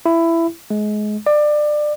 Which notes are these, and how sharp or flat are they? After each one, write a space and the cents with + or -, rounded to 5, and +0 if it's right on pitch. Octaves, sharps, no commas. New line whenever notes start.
E4 +15
G#3 +25
D5 +25